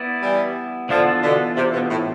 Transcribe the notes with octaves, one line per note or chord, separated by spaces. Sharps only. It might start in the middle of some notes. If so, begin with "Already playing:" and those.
Already playing: B3 E4 B4 D5
E3 G3
D3 E3 F3 B3 D4 F4 A4
B2 D3
C3
B2
A2